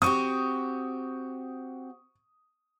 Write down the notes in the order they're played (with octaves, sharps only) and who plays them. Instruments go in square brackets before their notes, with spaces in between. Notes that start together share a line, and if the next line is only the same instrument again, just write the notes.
[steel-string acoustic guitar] C4 F#4 G4 [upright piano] C#6 D#6